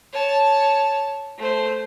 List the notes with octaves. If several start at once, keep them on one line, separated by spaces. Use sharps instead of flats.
C#5 A5
A3 C5